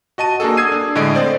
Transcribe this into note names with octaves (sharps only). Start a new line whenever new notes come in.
F#4 D#5 A5 D#7
A#3 D4 F#4 G#4 A4
D#6 E6 G#6 C7 D#7
D4
A2 D3 G#3 D#5 D7
C4 C5 D5